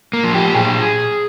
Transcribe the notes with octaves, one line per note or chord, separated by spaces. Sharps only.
A#3
F3
G4
A#2 G#4